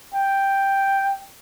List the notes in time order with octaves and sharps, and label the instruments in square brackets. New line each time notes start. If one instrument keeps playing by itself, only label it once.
[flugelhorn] G5